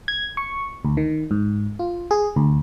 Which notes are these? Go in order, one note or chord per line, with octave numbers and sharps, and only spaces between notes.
G#6
C#6
D2
D#3
G#2
F4
G#4
D2